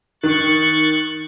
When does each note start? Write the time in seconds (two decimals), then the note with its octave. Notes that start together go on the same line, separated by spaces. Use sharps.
0.23 D#3 C#6 F#6 A6